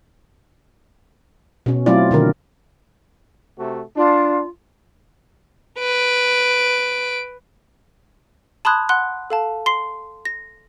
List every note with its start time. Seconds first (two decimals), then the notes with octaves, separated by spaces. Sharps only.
1.66 B2 C#4
1.86 F#3 A3 C4 E4 F4 D5
2.11 B2 D3 D#3 A#4
3.58 C3 A3 F#4
3.96 D4 F4
5.79 B4 D7
8.65 A5 B5 C6 D#6 F#6 G#6
8.89 F#5 C6 F#6
9.30 A4 F5 A5
9.66 C6 C7
10.25 A#6